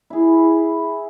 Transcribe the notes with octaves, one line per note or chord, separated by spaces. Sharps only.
E4 G#4